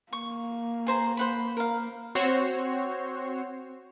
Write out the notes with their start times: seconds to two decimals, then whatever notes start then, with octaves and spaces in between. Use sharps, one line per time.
0.13 A#3 C#6
0.87 G#4 C5 A#5
1.17 C5 F#5 B5
1.57 A#4 F5
2.15 C4 F#4 C5 C#5